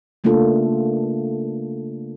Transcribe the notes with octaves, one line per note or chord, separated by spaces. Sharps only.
C#3 A3 A#3 D4 F4 A4